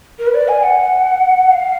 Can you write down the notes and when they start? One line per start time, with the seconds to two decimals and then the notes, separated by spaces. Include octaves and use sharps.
0.19 A#4
0.27 B4
0.34 D5
0.48 G#5
0.63 F#5
1.52 F5